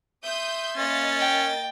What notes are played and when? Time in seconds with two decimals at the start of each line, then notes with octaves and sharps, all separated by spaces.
0.24 E5 C6 D#6 G6
0.77 A#3 C#4 D#5 A6
1.19 G5